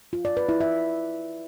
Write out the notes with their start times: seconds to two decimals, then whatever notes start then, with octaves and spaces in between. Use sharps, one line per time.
0.13 F4
0.25 D5
0.37 B4
0.49 E4
0.61 E5